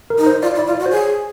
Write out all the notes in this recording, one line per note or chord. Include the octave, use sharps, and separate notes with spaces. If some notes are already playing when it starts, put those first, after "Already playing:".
A#4
D#4
C5
F4 D5
E4
D5
F4
D5
F#4
C5
G#4 C#5